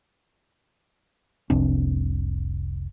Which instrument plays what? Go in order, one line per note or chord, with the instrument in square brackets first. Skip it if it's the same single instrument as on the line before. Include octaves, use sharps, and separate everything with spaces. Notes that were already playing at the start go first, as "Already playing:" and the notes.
[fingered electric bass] F1 C2 C4 D4